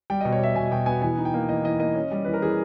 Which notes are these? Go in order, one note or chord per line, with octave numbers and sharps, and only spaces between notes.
G3 G5
B2 D#5
C#5
B2 E5
B2 G#5
B2 G5
B3 G#5
E3 G#5
D#4
G5
A#3
E3 D#5
E3 D#5
A#3 D#5
C#4
G3
E3 B4
A#4
E3 G#4